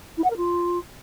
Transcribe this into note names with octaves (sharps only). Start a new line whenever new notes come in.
E4
F#5
A#4
F4